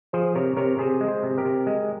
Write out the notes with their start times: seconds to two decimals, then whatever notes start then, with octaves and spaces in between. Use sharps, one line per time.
0.13 F3 G#4 C5
0.35 C3 A#4 C#5
0.57 C3 A#4 C#5
0.78 C3 G#4 C5
1.01 G#3
1.08 G#4 C5
1.23 C3
1.38 G4 A#4
1.45 C3
1.67 G#3